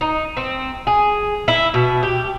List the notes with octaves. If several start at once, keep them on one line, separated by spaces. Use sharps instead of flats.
D#4
C4
G#4
E4
B2
G4